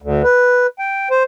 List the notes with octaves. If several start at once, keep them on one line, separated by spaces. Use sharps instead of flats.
D2
B4
G5
C5